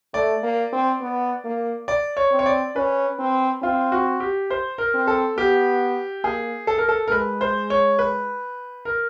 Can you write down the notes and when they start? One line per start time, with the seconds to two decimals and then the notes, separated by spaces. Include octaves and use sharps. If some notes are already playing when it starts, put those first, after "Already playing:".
0.14 A3 D5
0.43 A#3
0.72 C4
1.01 B3
1.45 A#3
1.88 D5
2.17 C#5
2.32 C4
2.39 C#5
2.46 D5
2.76 C#4 B4
3.19 C4
3.62 C4 F4
3.92 F#4
4.20 G4
4.50 C5
4.78 A#4
4.94 C4
5.07 A4
5.37 B3 G4
6.24 A#3 G#4
6.67 A4
6.78 A#4
6.89 A4
7.08 A#4
7.11 G#3 B4
7.41 C5
7.70 C#5
7.99 B4
8.85 A#4